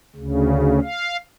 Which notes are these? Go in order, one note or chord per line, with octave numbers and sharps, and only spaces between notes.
D2 C#3
F5